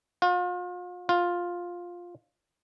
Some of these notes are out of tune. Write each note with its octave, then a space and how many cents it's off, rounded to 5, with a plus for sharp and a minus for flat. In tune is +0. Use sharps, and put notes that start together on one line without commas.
F4 +40
F4 +10